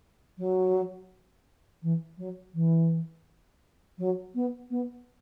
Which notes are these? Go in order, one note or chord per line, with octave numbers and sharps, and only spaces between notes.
F#3
E3
F#3
E3
F#3
B3
B3